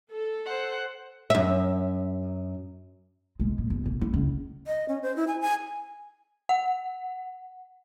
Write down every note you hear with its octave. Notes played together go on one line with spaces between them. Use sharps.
A4
C5 F#5
F#2 E5
B1 G#3
A#2
G1
B1
E4
C#2
D#5
C#4
C5
E4
G#5
G#5
F#5